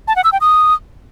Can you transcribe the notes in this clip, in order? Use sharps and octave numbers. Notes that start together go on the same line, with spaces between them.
A5
F#5
E6
G5
D#6